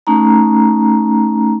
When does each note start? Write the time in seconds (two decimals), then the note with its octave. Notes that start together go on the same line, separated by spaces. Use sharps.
0.07 A3 C#4 D#4 A#5